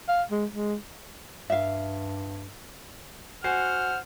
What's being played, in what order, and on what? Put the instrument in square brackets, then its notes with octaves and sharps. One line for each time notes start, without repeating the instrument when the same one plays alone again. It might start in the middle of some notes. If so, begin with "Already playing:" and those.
[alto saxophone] F5
G#3
G#3
[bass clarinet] G2 [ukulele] E5 F5
[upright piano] F#4 G#5 C7 [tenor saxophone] C5 [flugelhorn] F#5 [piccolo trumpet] F6